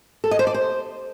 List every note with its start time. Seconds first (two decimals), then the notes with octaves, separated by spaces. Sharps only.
0.24 A4
0.31 D#5
0.39 C5
0.47 D5
0.54 C5